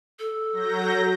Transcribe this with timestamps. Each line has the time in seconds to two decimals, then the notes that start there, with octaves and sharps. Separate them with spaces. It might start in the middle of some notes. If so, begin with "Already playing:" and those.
0.19 A4
0.52 F#3 G6 A#6